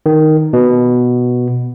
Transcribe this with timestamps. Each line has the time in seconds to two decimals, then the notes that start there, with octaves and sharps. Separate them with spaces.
0.06 D#3
0.53 B2